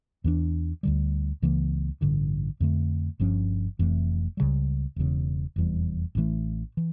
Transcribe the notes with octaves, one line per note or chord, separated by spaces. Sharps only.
E2 E3 A3 D4
D2 D3 G3
C#2 C#3 E3 A#3
A1 G2 D3
F2 D3 A3
G1 G2 F3 C#4
F1 F2 E3 A3
C#2 C#3 E3 G3
E1 E2 C#3
F1 E2 E3 G3
A1 A2 E3 A3
E3